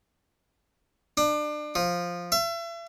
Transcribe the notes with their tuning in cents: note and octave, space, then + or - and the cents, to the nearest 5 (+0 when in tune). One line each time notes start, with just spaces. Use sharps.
D4 +30
F3 +5
E5 +40